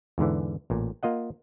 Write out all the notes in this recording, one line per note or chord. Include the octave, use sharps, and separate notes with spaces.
E2 G#2 D3 E3
A1 A#2
A#3 F4 D#5 F#5